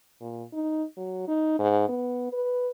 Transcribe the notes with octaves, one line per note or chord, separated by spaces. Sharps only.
A#2
D#4
F#3
D#4
G#2
B3
B4